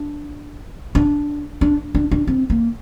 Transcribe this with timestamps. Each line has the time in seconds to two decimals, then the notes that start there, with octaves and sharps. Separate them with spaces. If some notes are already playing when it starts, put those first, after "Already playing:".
Already playing: D4
0.95 D4
1.61 D4
1.95 D4
2.11 D4
2.27 C4
2.50 A#3